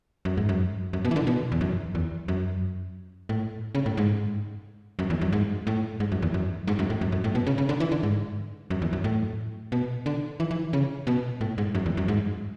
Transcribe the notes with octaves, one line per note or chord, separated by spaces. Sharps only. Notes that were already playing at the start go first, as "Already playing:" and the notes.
F#2
G#2
F#2
F#2
B2
E3
D3
B2
E2
F#2
E2
F#2
A2
C#3
A2
G#2
F#2
E2
F#2
G#2
A2
G#2
F#2
E2
F#2
G#2
F#2
A2
F#2
F#2
A2
B2
C#3
C#3
D3
E3
D3
G#2
F#2
E2
F#2
A2
B2
D3
E3
E3
C#3
B2
A2
G#2
F#2
E2
F#2
G#2